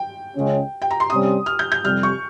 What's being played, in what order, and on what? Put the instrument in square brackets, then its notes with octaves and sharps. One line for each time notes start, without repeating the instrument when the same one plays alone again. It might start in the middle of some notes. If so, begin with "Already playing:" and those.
Already playing: [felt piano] G5
[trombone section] C#2 C#3 G#3 C#4
[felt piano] G5
A#5
C6
[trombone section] C3 G3 C#4 [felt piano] D#6
[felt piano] F6
G6
G6
[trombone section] F2 C3 G3 [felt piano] F6
[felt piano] C#6